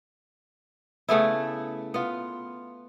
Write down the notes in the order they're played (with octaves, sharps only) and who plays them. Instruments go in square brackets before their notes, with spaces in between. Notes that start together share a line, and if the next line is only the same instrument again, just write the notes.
[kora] C#3 A3 B3 E4
B3 F4